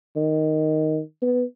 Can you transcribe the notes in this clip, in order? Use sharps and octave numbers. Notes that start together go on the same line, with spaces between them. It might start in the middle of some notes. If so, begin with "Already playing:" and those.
D#3
B3